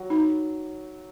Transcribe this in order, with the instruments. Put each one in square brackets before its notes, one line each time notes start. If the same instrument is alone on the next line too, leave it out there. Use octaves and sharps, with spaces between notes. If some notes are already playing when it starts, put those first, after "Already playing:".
Already playing: [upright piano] F#3 F#4
[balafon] D#4